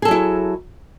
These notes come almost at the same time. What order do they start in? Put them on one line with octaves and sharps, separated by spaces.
G#4 A4 F#3 E4